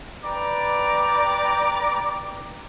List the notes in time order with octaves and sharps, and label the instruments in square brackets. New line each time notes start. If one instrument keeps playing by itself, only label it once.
[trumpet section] B4 D5 G5 A#5 D6